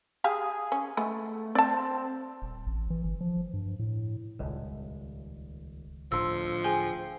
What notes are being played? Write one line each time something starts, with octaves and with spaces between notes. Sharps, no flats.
G4 G#4 E5 F5
C#4
G#3 A3 B3
C4 D5 A5
D#1
A1
E3
G1
F3
G2
A2
D#1 C#2
D1 A2 F3 D4 C6 E6
G#4 G5 G#5 G7